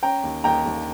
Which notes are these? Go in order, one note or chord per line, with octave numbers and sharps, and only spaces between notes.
C#4 G5 A#5
D#2
D#2 G5 A#5
D#2